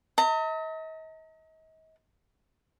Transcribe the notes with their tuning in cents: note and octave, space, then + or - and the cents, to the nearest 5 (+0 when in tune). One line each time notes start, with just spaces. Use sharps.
D#5 +40 A#5 -40